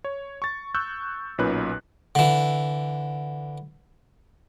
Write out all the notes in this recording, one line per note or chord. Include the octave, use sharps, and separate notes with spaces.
C#5
C#6 A6
C#6 E6 F#6 G6
B1 A#2 C#4 D#4 B4 F#6
D3 E3